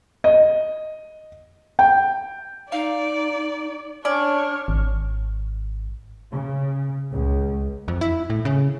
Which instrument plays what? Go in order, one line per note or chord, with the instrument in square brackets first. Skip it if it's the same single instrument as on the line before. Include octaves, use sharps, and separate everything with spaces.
[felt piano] D#5
G5
[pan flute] D#4 [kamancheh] D5 [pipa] F5
[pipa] C#4 D5 [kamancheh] D4 C#5 [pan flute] F6
[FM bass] G#1
[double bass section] C#3
C#2
[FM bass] F2
E4
A2
C#3